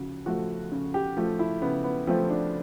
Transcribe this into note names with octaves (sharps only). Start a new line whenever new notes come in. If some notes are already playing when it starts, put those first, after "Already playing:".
Already playing: C#3 F3 F#4
F3 A3 F#4
C#3
G4
F3 A3
E4
C#3 B3
B3
F3 A3 C4
D4